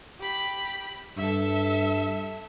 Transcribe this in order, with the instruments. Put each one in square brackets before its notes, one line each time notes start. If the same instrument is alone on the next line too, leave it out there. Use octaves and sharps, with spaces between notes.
[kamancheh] G4 B5
[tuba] G2 [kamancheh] A4 E5